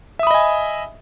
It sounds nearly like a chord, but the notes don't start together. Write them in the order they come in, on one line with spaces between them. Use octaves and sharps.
E5 D#6 B5 D#5 G#5